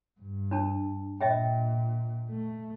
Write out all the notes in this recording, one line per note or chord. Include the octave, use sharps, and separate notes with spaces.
G2
D4 A5
A#2 D#5 E5 G5
A3